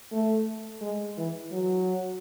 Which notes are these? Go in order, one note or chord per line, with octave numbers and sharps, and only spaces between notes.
A3
G#3
E3
F#3